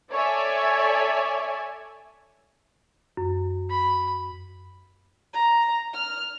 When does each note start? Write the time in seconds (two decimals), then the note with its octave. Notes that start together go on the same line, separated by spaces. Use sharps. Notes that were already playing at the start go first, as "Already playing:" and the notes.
0.11 A4 C#5 D5 E5 G#5
3.17 F#2
3.70 B5
5.33 A#5
5.94 F6